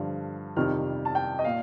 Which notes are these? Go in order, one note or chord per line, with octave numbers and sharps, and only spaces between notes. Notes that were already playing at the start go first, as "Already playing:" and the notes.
Already playing: G2 D3 F3
F2 C3 D#3 G3 F6
A5
G5
D#5
A#2 F5